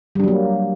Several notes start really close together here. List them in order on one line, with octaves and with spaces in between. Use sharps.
G3 D4 F#3 A#3